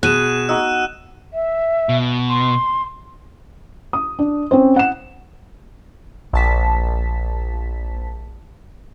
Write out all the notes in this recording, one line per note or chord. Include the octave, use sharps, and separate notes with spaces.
B2 G#4 F#6 D#7 E7
D#4 F#4 F#5 E6
E5
B2
C6
D#6
D4
C4 C#4 C5
F#5 E7
A#1 A5 B6